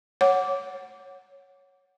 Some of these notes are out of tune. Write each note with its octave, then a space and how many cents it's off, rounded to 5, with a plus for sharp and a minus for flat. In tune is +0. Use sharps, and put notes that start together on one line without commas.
C#5 +0 F#5 +0 D6 -15